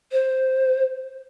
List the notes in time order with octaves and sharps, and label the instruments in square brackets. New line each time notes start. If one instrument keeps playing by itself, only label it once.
[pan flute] C5